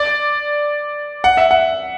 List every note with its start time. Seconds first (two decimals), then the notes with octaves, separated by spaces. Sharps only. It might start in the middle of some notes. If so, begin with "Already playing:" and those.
Already playing: D5
1.24 F#5
1.37 E5
1.51 F#5